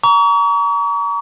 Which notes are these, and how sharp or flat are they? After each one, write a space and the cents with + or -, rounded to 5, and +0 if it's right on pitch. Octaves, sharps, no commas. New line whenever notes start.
A#5 +5 C#6 +40